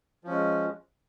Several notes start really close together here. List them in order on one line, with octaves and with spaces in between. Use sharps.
F3 C#4 G#3